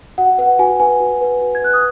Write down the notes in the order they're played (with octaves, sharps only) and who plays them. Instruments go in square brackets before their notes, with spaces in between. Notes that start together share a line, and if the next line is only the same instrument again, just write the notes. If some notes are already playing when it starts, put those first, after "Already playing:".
[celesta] F#4 F#5
B4 F#5
F#4 G#5
B4 G#5
F#4
B4
F#4
G#6
B4 F#6
D#6